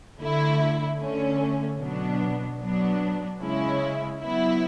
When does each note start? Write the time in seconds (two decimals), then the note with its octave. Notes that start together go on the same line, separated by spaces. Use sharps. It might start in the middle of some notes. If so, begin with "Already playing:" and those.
0.19 D3 A3 E4
0.99 D3 A3 C#4
1.79 B2 F#3 B3 D4
2.60 F#3 B3 D4
3.41 C#3 G#3 C#4 E4
4.22 F#3 B3 E4